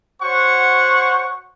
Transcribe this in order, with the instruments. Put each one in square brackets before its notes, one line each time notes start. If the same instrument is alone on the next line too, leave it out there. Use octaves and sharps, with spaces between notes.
[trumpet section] F#4 C5 C#5 F#5 C#6